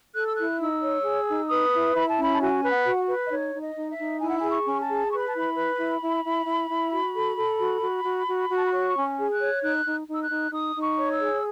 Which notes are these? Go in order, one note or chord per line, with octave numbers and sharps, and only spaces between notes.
A4 F#6
E6
E4 F#6
D#4 E6
C#5
G#4
D#4
B4 D#6
E4
E4 B5
A5
C#4
B5
A5
F#4 G#5
B4
F#5
F#4
B4
D#5
D#4 C#5
D#4
D#5
D#4
E5
D#4
E4 G#5
F#5
G#4 G#5
C#6
C#4
A5
G#4
B4 C#6
B5
A5
E4 B5
B4
E4
E4
E4
E4
E4
F#4
A4
A4
F#4
F#4
F#4
F#4
F#4
A5
B5
C#5 C#6
C#4
G#4
F#6
C#5
D#4 F#6
D#4
D#4
E6
F#6
D#4
D#4 D#6
D#4
C#6
C#5
E6
G#4